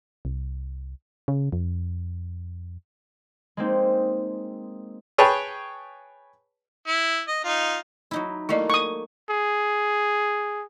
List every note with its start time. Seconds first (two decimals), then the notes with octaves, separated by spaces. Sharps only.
0.25 C2
1.28 C#3
1.52 F2
3.57 G#3 A#3 C4 D#4
5.18 G#4 B4 C#5 G5 A5 B5
6.87 E4
7.28 D#5
7.44 D#4 F4
8.11 F#3 D#4 E4
8.49 A3 A#3 E4 D5 D#5
8.70 C#6 D#6
9.30 G#4